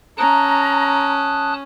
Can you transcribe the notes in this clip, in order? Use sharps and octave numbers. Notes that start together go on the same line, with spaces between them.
C#4 A5 A#5 D#6 F#6